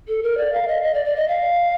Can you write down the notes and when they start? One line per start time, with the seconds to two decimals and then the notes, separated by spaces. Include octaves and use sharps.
0.08 A4
0.23 A#4
0.38 D5
0.53 F5
0.68 D#5
0.82 D#5
0.94 D5
1.05 D5
1.16 D#5
1.28 F5